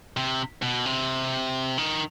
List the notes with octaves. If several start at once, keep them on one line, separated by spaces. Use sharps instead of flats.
C3
B2
C3
D#3